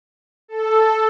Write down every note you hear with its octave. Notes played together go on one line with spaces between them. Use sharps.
A4